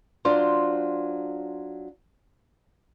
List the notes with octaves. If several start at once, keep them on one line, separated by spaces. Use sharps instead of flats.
F#3 D4 F4 C5